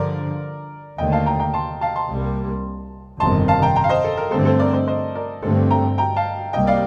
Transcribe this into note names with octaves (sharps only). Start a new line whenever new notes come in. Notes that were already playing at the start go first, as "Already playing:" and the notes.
Already playing: G2 D3 F3 A#4 D5
D#2 D3 A3 D#5 G5
F5 A5
G5 A#5
G5 A#5
A5 C6
F5 A5
A5 C6
C2 C3 G3 A#3
G1 F2 C3 D#3 A5 C6
F5 A5
G5 A#5
G5 A#5
F5
C5 D#5
A4
A#4
G2 D3 A3 C4 A4 C5
A4 C5
A#4 D5
C5 D#5
C5 D#5
A#4 D5
G2 D3 A3 C4 A4 C5
G5 A#5
G5 A#5
F5 A5
C2 C3 G3 A#3 D#5 G5
D5 F5